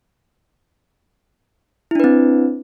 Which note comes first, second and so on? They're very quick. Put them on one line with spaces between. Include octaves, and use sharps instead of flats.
E4 D4 B4 C4